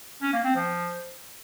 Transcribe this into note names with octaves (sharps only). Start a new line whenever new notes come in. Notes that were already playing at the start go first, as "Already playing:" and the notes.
C#4
A#3
C4
F3